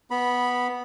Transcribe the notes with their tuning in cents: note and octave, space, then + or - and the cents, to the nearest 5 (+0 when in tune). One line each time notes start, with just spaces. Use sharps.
B3 +0 B5 -10